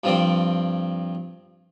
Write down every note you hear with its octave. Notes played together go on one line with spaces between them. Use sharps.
G2 F3 C4 D5